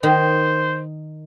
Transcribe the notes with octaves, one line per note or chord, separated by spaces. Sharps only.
D#3 C5